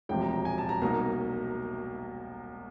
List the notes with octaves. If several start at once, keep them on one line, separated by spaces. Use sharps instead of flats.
E1 D2 C3 F3 G5
A#5
A#5
G#5
A5
A#5
C2 B2 F#3 A#3 D#4 A#5